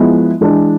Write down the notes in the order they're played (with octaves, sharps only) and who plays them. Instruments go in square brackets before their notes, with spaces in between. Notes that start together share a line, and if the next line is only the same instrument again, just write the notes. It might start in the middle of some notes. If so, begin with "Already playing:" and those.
Already playing: [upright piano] F3 G#3 B3 E4
E3 G#3 D4